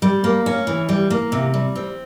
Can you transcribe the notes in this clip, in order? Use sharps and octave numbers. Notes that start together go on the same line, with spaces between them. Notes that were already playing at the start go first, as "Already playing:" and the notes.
G3
A#3
C#4
E3
G3
A#3
C3
G3
C4